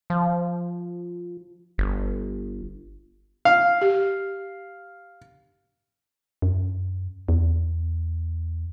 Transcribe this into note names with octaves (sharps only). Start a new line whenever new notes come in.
F3
G1
F5
G4
F#2
E2